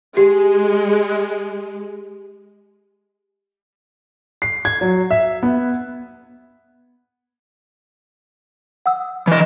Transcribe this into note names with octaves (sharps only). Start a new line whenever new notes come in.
G#3 G4
C7
G#6
F#3
E5
B3
F#5 D#6 E6
E3 D#5